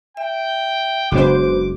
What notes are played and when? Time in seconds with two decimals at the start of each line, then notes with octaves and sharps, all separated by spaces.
0.17 E5 G5
1.12 F#1 C#3 G#3 B3 D4 F#4 C5 D6